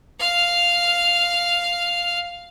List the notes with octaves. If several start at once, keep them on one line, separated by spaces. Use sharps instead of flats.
F5 F6